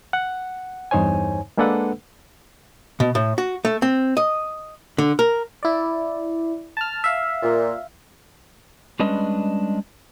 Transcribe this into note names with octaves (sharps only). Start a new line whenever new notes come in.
F#5
E2 G2 D#4 C5 C#5 G#5
G#3 A#3 D4 A4 B4 F#5
B2
A2
F#4
A3
C4
D#5
D3
A#4
E4 D5
A5 F6
E5 F5
A#2
G3 G#3 C#4 D4 B4 D#5